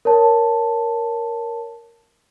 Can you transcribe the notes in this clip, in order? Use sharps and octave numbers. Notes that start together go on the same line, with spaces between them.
A#4 C#5 A5